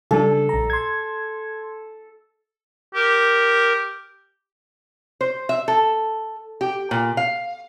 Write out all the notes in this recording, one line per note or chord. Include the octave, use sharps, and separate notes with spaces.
C#3 G3 D4 A4
A#1 A#5
C6 G#6
G4 A#4
C5
E5
A4
G4
A#2
F5